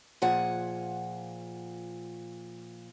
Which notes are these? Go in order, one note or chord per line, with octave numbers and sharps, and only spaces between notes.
A#2 F3 G#4 F#5